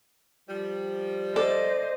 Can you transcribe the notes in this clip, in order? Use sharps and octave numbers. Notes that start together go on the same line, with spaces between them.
F3 G3
A4 C5 D5 D#5